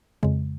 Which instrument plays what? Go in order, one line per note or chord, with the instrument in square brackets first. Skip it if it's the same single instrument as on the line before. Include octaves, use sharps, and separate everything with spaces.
[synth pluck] F2 C#3 G#3